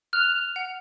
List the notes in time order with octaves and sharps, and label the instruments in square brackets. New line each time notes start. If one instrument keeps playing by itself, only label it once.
[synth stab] F6 [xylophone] F#6
[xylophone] F#5